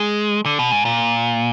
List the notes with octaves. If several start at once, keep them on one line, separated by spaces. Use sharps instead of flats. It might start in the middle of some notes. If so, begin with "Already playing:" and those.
Already playing: G#3
D3
B2
G#2
A#2